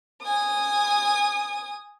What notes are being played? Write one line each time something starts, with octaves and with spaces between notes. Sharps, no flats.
G#5 D#6